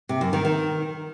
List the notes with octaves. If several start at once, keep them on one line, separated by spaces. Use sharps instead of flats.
C3
F#2
D#3
D#3